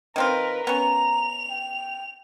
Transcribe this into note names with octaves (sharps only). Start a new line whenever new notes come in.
D#3 C4 F4 A#4 B4
B3 C#4 A#5 F7
G5